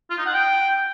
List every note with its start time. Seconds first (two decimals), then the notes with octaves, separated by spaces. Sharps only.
0.10 F4
0.18 D#4
0.26 F#5
0.34 G5